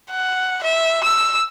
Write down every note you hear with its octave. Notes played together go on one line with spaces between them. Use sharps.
F#5
E5
E6